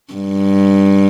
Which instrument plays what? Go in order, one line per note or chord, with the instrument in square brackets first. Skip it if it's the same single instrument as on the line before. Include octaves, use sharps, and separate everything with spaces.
[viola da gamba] G2